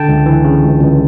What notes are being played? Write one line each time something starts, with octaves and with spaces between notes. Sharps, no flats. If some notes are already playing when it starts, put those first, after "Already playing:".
Already playing: D3 G5 A5
C#2
E3
C#3
C#2
C#2